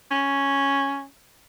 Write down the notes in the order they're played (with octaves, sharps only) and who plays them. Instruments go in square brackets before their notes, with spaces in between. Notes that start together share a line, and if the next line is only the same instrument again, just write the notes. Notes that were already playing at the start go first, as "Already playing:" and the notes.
[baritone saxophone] C#4